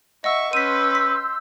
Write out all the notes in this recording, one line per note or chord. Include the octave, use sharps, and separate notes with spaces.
D#5 E5 F#5 C#6 E6
C#4 B4 C6 E6 G6 B6 D#7
B6